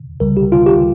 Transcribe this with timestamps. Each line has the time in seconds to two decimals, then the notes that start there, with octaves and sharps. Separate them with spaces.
0.20 C#2 C#3 G3 A#4
0.37 G4
0.52 F4
0.66 G4